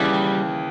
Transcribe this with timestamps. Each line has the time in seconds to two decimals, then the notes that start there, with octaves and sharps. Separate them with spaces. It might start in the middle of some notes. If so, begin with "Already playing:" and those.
Already playing: D#2 C#3 E3 G3